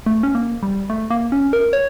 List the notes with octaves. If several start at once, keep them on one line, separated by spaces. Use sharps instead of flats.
A3
C#4
A#3
G3
A3
A#3
C#4
A#4
C#5